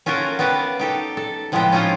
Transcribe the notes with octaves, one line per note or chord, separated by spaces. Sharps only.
C#4 F4 F#4 A4 A#4
B3 F#4 G4 B4 F5 A5
D#4 G4 A4
A4
A2 F3 G#3 B3 C4 G4
C#4 D#4 F4 C5